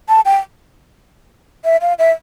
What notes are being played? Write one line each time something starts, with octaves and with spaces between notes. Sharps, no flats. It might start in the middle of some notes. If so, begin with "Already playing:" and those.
A5
G5
E5
F5
E5